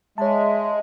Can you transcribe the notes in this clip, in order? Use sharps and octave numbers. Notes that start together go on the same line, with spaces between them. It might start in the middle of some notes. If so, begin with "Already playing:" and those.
G#3 C#5 E5 A5